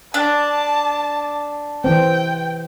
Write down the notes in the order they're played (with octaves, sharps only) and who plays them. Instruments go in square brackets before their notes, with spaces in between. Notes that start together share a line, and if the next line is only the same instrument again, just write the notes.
[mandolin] D4 [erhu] A5
[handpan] E3 C4 [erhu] G5